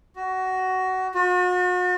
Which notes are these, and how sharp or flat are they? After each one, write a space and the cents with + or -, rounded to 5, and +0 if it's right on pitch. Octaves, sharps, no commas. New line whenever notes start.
F#4 +15
F#4 -40